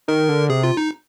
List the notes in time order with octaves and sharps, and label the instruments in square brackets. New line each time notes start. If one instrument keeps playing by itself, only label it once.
[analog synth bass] D#3 [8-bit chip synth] A#4
[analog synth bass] D3
[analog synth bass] C3 [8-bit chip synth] G#4
[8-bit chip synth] F4
D#4